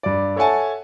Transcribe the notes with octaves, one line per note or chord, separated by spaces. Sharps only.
G2 D5
A4 C#5 E5 F#5 G#5 A5